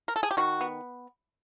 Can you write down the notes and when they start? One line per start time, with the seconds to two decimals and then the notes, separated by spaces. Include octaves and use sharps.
0.08 A#4
0.16 A4
0.23 G#4
0.31 G4
0.37 D#3 F#4
0.61 B3